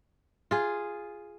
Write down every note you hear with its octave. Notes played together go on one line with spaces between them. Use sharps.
F4 G#4